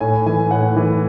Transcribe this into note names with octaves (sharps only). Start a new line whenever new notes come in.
A2 G#5
E3 G#5
A2 F#5
E3